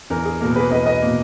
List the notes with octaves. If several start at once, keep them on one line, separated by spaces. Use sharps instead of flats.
E2 A#4
G#4
B2 A#3 A#4
G#4 B4
E2 B4 D#5
B4 D#5
B2 A#3